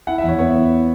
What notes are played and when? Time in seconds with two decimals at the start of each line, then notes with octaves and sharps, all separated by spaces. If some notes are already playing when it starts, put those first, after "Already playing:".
0.07 E4 F#5
0.18 E5
0.23 E2
0.29 C#5
0.39 B3 C#5
0.55 E4